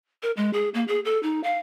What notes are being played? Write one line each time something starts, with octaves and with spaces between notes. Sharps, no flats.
A#4
G#3
G#4
A#3
G#4
A4
D#4
F5